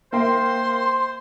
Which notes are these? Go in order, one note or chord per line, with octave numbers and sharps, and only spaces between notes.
A#3 C5 E5 G5 C6